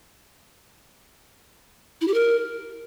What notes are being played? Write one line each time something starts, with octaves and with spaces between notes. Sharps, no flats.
E4
G4
A#4